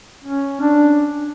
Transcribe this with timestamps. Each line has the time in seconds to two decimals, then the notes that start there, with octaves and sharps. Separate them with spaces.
0.24 C#4
0.61 D4